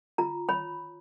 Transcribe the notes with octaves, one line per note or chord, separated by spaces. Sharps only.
F4 A#5
C#5 B5